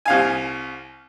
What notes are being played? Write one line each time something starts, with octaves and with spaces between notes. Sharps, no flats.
C2 F5 G#5